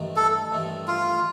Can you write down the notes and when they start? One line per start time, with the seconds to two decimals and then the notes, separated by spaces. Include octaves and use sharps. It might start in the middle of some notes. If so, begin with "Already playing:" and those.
Already playing: A1 G2 D#3 A3 D#4
0.16 A4
0.52 A1 G2 D#3 A3 D#4
0.88 F4